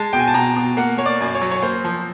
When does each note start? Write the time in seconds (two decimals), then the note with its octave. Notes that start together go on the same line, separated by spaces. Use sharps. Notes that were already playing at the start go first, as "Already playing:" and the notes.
Already playing: G#3 A5
0.13 B2 G5
0.20 G#5
0.28 A5
0.34 B2 A#5
0.56 B2
0.77 A#3 F#5
0.98 A#3 C#5
1.06 D5
1.20 F#2
1.35 C#5
1.42 F#3
1.51 C#5
1.62 A#3 C5
1.84 F3